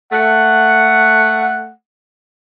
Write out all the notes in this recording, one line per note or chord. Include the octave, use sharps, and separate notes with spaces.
A3 F#5